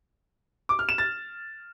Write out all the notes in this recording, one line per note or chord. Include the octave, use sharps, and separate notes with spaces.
D6
F6
E7
A6